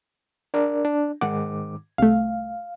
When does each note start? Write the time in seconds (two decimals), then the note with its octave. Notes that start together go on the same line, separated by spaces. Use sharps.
0.54 D4 A#4 D5
0.85 D4
1.21 G#2 D#3 F#5 D6
1.98 C2 A3 F5